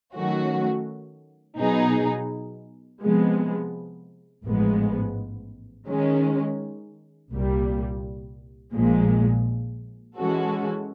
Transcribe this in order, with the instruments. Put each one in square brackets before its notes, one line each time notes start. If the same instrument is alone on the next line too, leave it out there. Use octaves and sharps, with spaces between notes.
[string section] D#3 F#3 A3 C#4 F#4
B2 F#3 B3 D#4 G#4
C3 F3 G#3 B3
A1 G#2 F3 G#3 B3
D#3 G#3 C#4
C2 A#2 G3
A#1 A#2 F3 G#3
E3 G#3 C#4 F#4 A4